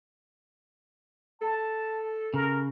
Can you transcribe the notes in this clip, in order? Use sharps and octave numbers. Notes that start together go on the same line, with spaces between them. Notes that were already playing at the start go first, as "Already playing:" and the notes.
A4 A5
C#3 A#4